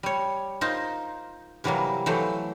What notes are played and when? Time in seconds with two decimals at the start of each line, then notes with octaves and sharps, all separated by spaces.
0.03 G3 C#5
0.61 D#4 F4 A#4 C5
1.64 C3 E3 F#3 G3 A#3
2.06 E3 F#3 A3 C5